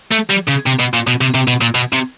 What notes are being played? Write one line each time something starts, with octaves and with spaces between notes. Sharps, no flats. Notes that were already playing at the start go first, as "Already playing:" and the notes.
A3
G3
C#3
C3
B2
A#2
B2
C3
C3
B2
A#2
B2
C3